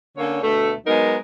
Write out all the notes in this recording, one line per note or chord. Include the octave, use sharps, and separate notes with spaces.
D3 A#3 C#4 C#5
D2 B2 A3
F#3 G#3 B3 D#4 A#4